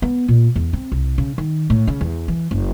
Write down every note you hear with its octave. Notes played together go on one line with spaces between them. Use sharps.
B3
A#2
E2
C4
C2
C#3
D#3
A2
C#3
E2
E3
F#1